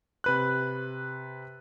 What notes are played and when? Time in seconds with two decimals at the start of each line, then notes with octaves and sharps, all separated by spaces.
0.24 C3 B4 F#6